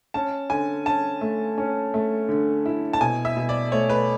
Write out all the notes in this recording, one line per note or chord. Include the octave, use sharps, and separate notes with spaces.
C#4 A5
D3 G#5
C#4 A5
A3
C#4
A3
D3
E4
A5
B2 G#5
E5
B2
D5
A3 C#5
B4